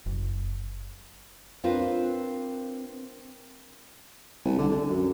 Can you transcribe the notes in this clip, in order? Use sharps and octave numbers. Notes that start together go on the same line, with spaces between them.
F#1
C4 D4 F4 A#4 B4
C2
D3
D3
F#2